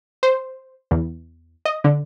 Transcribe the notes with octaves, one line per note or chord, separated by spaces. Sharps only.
C5
E2
D#5
D3